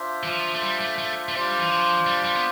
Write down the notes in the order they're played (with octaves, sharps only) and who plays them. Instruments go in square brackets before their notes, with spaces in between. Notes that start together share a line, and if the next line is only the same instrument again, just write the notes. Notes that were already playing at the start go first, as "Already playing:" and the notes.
Already playing: [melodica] D4 F4 C5 E5
[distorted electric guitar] E3
F3
A3
G3
A3
A3
A3
[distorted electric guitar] G3 [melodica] D4 F4 C5
[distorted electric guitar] E3
F3
G3
G3
B3